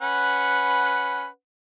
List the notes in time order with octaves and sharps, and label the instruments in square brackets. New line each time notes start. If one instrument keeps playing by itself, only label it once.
[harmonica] C#4 B4 F#5